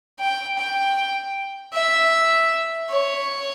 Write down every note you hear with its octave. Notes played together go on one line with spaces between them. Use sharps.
G5
G5
E5
C#5